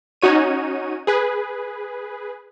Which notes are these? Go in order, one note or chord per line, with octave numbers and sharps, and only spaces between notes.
C#4 D#4 F#4 C#5 D#7
G#4 B4